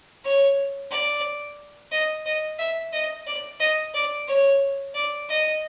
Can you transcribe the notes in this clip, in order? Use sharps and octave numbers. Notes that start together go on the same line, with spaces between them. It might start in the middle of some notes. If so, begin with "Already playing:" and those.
C#5
D5
D#5
D#5
E5
D#5
D5
D#5
D5
C#5
D5
D#5